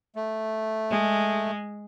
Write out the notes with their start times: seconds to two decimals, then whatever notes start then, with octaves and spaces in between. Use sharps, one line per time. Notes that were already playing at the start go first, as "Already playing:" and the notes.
0.16 A3
0.90 G#3